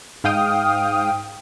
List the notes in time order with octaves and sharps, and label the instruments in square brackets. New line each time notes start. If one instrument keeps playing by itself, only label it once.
[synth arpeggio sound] G#2 F5 G5 D#6 F6